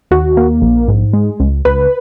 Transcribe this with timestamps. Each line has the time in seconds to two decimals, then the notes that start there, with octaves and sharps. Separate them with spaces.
0.11 D#2 F#4
0.37 A#3
0.62 A#1
0.88 G#2
1.13 G#3
1.40 C#2
1.65 C#2 B4